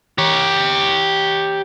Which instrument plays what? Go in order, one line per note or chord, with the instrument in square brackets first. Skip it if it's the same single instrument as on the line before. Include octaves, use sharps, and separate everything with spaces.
[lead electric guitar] G4 C#5